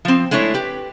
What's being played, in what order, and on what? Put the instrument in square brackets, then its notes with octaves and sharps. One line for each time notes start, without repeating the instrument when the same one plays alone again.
[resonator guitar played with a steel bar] F3 C4
G#3 A3 D4 E4 C#5
G4 B4